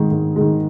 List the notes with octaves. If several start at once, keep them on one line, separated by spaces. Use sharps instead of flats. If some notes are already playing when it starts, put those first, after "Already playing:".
Already playing: G#2 D#3 G#3
G#2
D#3 G#3